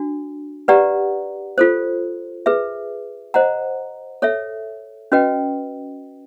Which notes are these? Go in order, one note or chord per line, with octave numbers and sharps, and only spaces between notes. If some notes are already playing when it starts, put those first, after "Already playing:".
Already playing: D4 F#4
G4 B4 D5 F#5 A#5
F4 A4 C5
G#4 B4 E5
C5 D#5 F#5 A#5
A4 C#5 E5
C#4 F#4 B4 D#5 G5